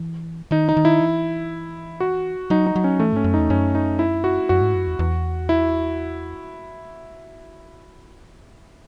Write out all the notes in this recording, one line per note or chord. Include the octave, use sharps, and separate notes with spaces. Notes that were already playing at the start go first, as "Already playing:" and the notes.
Already playing: E3
D#3 D#4
D#4
D#3
E4
E3
F#4
F#3 D#4
D#4
F#3
C#4
E3 A3
G#2 C#4
F#2
E2 D#4
F#2 C#4
D#4
E4
F#4
F#2 F#4
G#2
F#2
E2
E2
E4